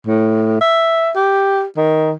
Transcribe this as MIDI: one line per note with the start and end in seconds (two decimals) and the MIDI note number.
0.07 0.59 45
0.61 1.11 76
1.15 1.64 67
1.77 2.13 51